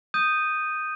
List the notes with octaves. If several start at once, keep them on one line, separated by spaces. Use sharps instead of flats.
D#6 G6 D#7